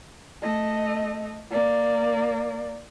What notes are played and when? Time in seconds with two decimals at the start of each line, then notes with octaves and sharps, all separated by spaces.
0.42 A3 D#5
1.50 A#3 D5